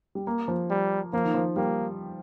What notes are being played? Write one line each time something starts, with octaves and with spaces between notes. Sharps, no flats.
G3
A#3
F3
G3
F3 A#3
D#3
F3
G3 A#3